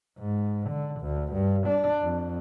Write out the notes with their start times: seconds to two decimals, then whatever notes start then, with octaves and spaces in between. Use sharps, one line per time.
0.19 G#2
0.69 D3
1.01 D2
1.33 G2
1.67 D4
2.03 F2